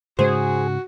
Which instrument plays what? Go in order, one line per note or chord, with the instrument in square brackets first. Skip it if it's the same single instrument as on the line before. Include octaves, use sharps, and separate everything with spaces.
[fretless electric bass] G#2 C#3 G#3 [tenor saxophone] F#4 [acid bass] G#4 [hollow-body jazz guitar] C5